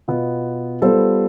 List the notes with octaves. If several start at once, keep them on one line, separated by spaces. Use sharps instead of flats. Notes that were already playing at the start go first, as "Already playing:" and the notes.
B2 B3 F4
G3 B3 F4 A4 C5